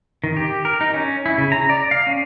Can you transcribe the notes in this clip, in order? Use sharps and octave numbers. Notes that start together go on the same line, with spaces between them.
D#3
G4
A#4
D#4
C#4
E4
C#3
A#5
D5
F5
C#4